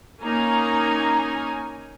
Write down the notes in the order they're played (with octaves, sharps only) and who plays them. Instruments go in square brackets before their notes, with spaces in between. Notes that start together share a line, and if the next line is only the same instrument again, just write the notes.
[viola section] A#3 C#4 D#4 G#5 A#5